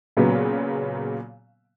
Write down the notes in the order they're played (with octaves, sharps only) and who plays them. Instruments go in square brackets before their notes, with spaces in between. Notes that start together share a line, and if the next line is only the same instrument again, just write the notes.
[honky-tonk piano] A#2 C#3 F#3 A#3 B3